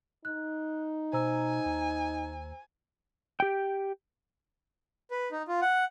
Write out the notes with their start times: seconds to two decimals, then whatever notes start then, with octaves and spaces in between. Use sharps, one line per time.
0.25 D#4 F#6
1.13 B2 C5 G#5 A#5 E6
1.66 D#2
3.40 G4 G5
5.11 B4
5.32 D#4
5.48 F4
5.62 F#5